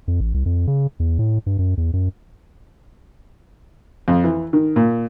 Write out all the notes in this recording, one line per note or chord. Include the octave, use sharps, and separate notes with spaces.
F2
A1
C2
F2
C#3
E2
A2
G2
F#2
E2
F#2
F2
E3
D#3
A#2